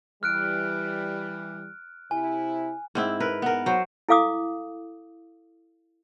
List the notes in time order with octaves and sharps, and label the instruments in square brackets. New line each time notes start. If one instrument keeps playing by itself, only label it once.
[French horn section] E3 G3 [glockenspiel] F6 F#6 D7
[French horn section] C3 E4 [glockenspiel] G#5
[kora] G#2 C4 E4
A#4 B4
B3 A#4
F#3 C5
[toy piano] E4 A4 F5 D6 D#6